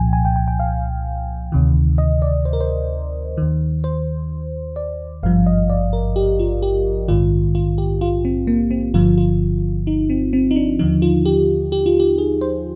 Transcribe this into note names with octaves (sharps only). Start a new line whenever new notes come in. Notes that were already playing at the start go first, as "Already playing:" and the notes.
Already playing: C2 A#2 F3 G5 G#5
G#5
G5
G5
G5
F5
D2 C3 D#3
D#5
D5
C5
A#4
C5
D#2 D#3
C5
D5
G#1 G2 F3 F5
D#5
D5
A#4
G4
F4
G4
A#1 G#2 D#3 F4
F4
G4
F4
C4
A#3
C4
G1 G2 D3 F3 F4
F4
D#4
C4
C4
D#4
D4
D#2 D3 F3 D#4
F4
G4
G4
F4
G4
G#4
C5